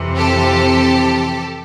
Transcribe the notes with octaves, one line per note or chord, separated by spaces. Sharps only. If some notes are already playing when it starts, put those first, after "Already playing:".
Already playing: F2 C3 E3
G4 A4